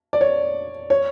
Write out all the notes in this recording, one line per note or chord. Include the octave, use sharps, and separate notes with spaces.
D5
C#5
C#5